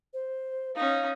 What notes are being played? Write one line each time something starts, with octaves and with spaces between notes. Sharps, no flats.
C5
C#4 D#4 F5